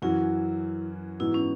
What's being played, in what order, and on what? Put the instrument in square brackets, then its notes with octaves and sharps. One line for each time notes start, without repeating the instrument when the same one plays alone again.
[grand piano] F#2 E3 C#4 F#4 [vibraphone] E4
[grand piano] G#2 E3 B3 F#4 [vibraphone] E4
[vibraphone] C#4